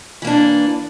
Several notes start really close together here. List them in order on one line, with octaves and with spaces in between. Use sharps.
E3 A#3 D4